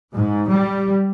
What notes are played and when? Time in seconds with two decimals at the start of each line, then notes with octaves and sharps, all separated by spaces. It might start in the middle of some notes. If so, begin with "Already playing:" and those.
0.15 G#2
0.51 G3